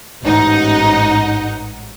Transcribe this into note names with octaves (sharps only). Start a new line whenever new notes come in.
A1 G#2 D#4 F#5